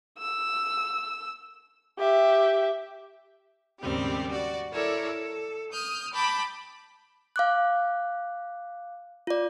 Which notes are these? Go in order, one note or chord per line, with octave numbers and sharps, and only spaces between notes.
E6
G4 E5
D#2 G#2 C#3 G3 C4 G4
F#4 D5
E4 A4 A#4 C#5 D5
A4
D#6 F6 G6
G5 A5 B5 D6
F5 D6 F#6
F4 D5